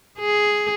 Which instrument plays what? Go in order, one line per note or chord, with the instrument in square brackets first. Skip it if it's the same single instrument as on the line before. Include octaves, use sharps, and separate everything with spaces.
[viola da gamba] G#4